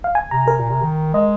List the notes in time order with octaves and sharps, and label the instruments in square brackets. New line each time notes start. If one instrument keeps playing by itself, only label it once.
[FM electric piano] F5
G#5
[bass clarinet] C3 [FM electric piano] A#5
[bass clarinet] C3 [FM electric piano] A#4
[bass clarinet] A#2
C3
D#3
[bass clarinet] G#3 [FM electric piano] D#5